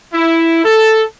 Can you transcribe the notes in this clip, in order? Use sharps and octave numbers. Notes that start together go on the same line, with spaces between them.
E4
A4